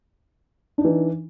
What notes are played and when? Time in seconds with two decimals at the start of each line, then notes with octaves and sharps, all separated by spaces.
0.78 D4
0.81 D#4
0.85 E3